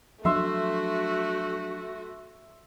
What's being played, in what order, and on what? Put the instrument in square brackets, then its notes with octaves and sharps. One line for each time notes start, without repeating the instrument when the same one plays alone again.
[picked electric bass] F3 F#3 D4 [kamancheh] A3 [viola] F#4 [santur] E5 C6